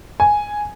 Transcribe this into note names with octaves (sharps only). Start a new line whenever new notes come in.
G#5